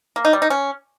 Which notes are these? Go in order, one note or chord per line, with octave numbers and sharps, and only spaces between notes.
A#3
D#4
G3
D#4
C#4